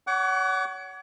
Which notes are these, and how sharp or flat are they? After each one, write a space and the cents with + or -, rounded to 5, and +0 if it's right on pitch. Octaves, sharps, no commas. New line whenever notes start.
C#5 +25 F#5 +20 D6 -35